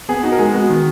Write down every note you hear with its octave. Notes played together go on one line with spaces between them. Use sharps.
B3 G#4
D#4 F#4
A#4
G#3 G#4
B3 F#4
D#3